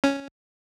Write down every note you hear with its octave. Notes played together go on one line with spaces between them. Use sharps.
C#4